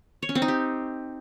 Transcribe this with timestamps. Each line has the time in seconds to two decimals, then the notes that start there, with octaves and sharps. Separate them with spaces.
0.23 C#5
0.29 C#4
0.35 C4
0.42 D#4
0.48 G4